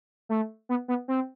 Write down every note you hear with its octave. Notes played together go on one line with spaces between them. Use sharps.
A3
B3
B3
C4